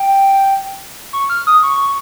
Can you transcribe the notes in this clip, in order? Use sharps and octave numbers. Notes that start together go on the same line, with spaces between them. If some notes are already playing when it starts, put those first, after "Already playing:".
Already playing: G5
C#6
F6
D#6
C#6